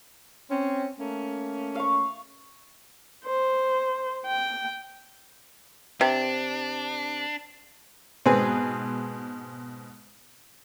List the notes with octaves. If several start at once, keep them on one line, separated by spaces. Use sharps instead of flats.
C4 C#4
A3 A#3 C#4
F5 C#6
C5
G5
C3 D4
G#2 B2 C4 G#4 B4